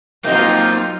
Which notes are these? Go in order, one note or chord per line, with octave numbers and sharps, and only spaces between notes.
F#3 A#3 C4 D#4 F4 D#5 F5 G5